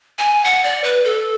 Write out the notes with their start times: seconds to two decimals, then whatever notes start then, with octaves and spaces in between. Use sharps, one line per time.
0.19 G#5
0.45 F#5
0.64 D5
0.84 B4
1.05 A4